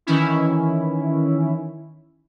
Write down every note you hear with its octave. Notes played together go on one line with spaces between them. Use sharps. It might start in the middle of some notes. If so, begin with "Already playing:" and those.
D#3 E3 C#4 E4